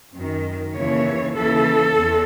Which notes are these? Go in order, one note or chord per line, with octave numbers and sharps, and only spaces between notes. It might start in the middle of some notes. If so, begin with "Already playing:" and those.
F#2
D#3
D#2 C#3 E3 C#5
D#2 C#3 E3 A4
E2